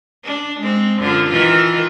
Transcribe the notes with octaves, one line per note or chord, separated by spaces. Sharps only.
D4
G#3 C4
F#2 D3 F4
D#3 E3 F4